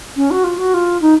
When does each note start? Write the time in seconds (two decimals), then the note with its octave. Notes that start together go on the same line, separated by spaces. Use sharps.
0.16 C#4
0.31 F#4
0.44 F4
0.58 F#4
0.74 F4
1.02 D#4